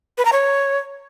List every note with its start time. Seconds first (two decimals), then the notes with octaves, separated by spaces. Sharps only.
0.18 B4
0.25 A#5
0.33 C#5